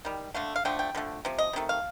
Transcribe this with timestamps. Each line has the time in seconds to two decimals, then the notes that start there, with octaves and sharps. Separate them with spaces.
0.05 D#3 G3
0.34 D3 A3 F5
0.56 F5
0.65 D3 F3 A3 G5
0.79 G5
0.95 D3 F3 A3
1.25 C3 F3
1.38 D#5
1.53 C3 D#3 A3
1.69 F5